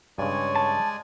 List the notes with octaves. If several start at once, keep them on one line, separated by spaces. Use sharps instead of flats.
G2 C#3 G#3 C#5 D5 G#5
A5